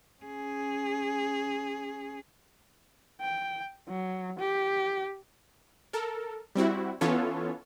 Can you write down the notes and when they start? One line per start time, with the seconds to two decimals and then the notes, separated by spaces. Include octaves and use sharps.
0.23 C#4 G#4
3.21 G5
3.89 F#3
4.39 G4
5.93 A4 A#4
6.55 G3 C4 E4 F#4
7.01 E3 B3 C#4 F4 A4 C#5